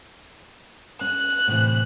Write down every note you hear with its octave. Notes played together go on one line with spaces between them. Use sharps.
C#4 F#6
A2 C3 E3